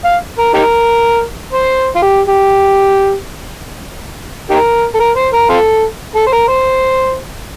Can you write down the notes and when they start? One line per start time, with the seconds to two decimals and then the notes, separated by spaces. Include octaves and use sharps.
0.05 F5
0.38 A#4
0.54 D#4 G4 A#4
1.53 C5
1.96 F4
2.02 G4
2.28 G4
4.50 D#4 G4 A#4
4.95 A4
4.99 A#4
5.16 C5
5.33 A#4
5.50 C4 F4 A4
6.15 A4
6.27 C5
6.32 A#4
6.48 C5